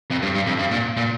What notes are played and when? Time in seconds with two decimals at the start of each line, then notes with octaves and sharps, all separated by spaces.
0.10 F2
0.22 G2
0.35 G2
0.47 F2
0.59 G2
0.71 A#2
0.97 A#2